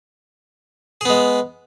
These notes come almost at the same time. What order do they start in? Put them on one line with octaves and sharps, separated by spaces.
G#4 B3 G#3